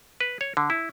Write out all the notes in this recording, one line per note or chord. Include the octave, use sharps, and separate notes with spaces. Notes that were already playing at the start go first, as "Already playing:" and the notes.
B4
C#5
D3
E4